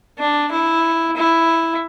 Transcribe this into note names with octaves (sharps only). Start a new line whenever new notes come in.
D4
E4
E4